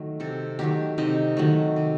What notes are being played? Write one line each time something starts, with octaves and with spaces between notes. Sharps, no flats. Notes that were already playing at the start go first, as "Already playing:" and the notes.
Already playing: D#3 F#3 A3
C3 A4
D#3 F#3 A3 G4
C3 D#4
D#3 F#3 A3
C3